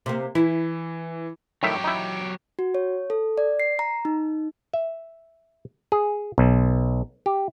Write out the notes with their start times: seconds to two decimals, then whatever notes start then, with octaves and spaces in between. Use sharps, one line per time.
0.06 C3 A#3
0.35 E3 E4
1.63 A2 D#3 F#3 G4 E5
1.84 D#4 E4
2.59 F#4
2.74 C#5
3.10 A4
3.38 D5
3.60 C7
3.79 A#5
4.05 D#4
4.73 E5
5.92 G#4
6.38 B1
7.26 G4